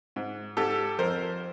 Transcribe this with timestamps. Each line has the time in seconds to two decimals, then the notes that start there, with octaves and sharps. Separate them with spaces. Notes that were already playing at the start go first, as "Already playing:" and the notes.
0.16 G#2
0.57 G#2 G4 A4
0.99 F2 A#4 C5